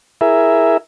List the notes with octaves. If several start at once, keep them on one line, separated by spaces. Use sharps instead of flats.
E4 G#4 A#4 E5